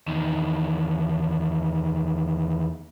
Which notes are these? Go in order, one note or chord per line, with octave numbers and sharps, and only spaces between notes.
E2 D#3